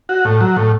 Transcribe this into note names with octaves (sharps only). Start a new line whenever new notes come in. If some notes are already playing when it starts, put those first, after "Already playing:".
F#4
A2
F#3
A2